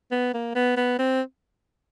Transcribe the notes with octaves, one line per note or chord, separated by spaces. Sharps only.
B3
A#3
B3
B3
C4